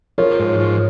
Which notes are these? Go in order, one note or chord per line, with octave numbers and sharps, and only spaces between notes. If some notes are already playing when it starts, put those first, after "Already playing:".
F3 A#4 C#5
G#2
F3